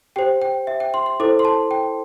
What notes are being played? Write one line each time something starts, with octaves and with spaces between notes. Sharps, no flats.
G4 C5 G5
G5
E5
G5
C6
C6
E4 A4 C5 D6
C6
A5
G5